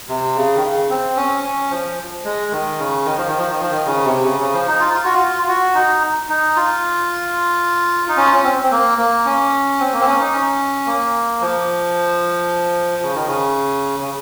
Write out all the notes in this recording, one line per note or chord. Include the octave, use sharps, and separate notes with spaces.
C3
C#3
D#3
C#3
C4
C#4
C#4
F3
G#3
D#3
C#3
D#3
F3
D#3
F3
D#3
F3
D#3
C#3
C3
C#3
C#3
F3
D#4
F4
F4
F#4
F4
F4
F#4
D#4
D#4
F4
D#4
C#4
C#4
C4
C4
A#3
A#3
C#4
C4
A#3
C4
C#4
D#4
C#4
A#3
F3
C#3
D#3
C#3
C#3